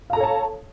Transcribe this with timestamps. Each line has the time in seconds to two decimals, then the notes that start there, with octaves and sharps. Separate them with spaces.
0.10 F5
0.13 A#5
0.17 A4
0.20 C#5
0.23 A5